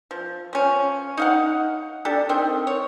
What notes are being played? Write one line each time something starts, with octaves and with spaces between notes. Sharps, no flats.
F3
F3 C#4
D#4 F5 F#5
D4 G4 A4
D#3 C4 G5
C#5